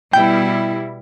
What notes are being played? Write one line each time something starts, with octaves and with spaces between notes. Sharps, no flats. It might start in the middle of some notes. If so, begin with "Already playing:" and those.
B2 G3 E4 G5